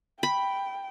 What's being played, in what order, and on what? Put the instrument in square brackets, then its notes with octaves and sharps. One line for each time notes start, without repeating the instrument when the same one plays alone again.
[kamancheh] G5 [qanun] B5